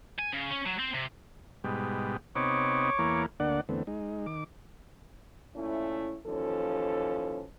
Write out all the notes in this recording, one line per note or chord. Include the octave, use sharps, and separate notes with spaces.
G#5
C#3
C#4
F#3
C4
C3
G#2 B2 G3
C3 B3 D#4 C#5 C#6 D6
E2 A#3
D2 A#3 D4 D5 F#5
E2 D3 A3 B3 C4
G#3 D#4
D#3 D6
A#2 A3 C#4 E4
D#2 E3 F3 C#4 A4